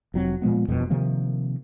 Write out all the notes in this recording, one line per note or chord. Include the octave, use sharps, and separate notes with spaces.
F1 F#3 C4
A#2 F3 G#3 B3
E1 F2 B2 G3
C3 D#3 F3 A#3